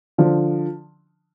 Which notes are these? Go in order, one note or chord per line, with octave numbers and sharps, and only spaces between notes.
D3 F3